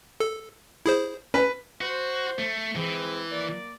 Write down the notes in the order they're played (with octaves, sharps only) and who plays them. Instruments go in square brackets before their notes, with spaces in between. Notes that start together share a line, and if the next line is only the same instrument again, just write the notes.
[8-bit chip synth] A4
E4 G#4 C5
[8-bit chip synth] C#4 [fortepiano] B4
[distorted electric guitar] F#4 [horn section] C5
[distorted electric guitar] A3
[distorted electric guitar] E3 [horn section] G#3 C4 B5
[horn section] A#3 D5